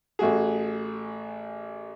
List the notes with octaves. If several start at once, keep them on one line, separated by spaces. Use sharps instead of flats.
A1 A3 F#4 G#4